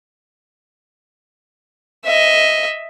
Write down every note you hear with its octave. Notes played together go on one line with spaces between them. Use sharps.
D#5 E5